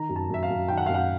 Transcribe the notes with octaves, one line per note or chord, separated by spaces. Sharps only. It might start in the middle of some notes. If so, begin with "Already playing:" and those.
Already playing: D#3 A#5
F#2
A5
F#2 E5
F5
F#2
D#3 G5
F#5
F#2 F5
F#5